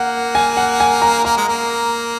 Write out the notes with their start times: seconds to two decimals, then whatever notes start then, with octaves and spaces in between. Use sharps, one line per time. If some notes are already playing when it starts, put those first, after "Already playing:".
Already playing: A#3 F#5
0.35 G#5
0.57 F#5
0.80 G#5
1.02 A#5
1.24 A#3 A#5
1.37 G#3
1.48 A#3